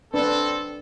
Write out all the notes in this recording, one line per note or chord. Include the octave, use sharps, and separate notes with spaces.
C4 D4 A4 B4